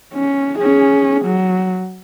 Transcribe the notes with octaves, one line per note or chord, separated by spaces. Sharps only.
C#4
C#4 G#4
F#3